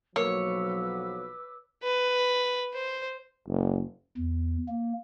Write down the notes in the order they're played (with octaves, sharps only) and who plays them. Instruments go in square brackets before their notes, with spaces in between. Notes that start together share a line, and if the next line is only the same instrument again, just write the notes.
[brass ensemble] B1 F3 F#3 [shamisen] A#3 [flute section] B4 D6 E6 [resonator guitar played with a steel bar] C#5
[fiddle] B4
C5
[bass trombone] F#1
[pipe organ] E2
A#3